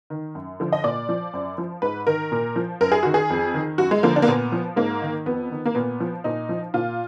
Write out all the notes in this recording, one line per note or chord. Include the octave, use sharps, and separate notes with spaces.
D#3
F#2
D3 F3
D#5
A#2 D5
F3
F#2
F3
G#2 B4
D#3 A#4
A#2
F3
F#2 A#4
G#4
D#3 F#4
G#4
F2
D#3
F#2 F#4
G#3
D3 F3 A#3
D4
A#3
A#2 B3
F3
G#2 A#3
D#3
F2 B3
D#3
A#3
A#2 B3
F3
A#2 D#4
F3
A#2 F4